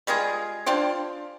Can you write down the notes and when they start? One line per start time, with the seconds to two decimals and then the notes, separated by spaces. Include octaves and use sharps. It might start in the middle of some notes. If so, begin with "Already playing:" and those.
0.07 G3 G#3 F4 G#4
0.66 D4 F4 G4 C5